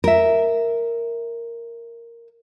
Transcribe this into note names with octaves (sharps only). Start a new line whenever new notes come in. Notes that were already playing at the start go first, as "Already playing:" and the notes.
A#4 E5